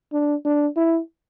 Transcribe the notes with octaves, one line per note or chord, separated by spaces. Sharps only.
D4
D4
E4